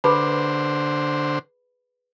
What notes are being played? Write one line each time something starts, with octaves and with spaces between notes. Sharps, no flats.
D3 G#4 B4 C5 B5